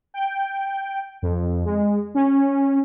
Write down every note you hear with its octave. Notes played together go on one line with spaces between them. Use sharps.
G5
F2
G#3
C#4